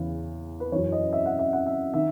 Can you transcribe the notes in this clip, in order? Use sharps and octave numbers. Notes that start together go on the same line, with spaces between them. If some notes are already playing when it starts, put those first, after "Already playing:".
Already playing: E2 C#3 E3
B4
F#2 E3 C#5
D#5
E5
F#5
E5
F#5
E5
D#3 E5